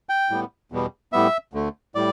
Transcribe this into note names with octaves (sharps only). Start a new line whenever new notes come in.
G5
A2 G3 B3
E2 B2 G3 B3
A2 G3 B3 E5
D2 D3 A3
A2 G3 D5